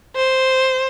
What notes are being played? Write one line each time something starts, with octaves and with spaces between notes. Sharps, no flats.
C5